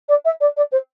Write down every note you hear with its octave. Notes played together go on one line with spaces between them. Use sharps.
D5
E5
D5
D5
C5